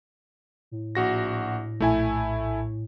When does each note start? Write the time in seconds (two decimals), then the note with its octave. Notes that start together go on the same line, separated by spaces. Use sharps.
0.71 A2
0.95 A#1 F#4 A#6
1.80 A#1 A3 E4 G#5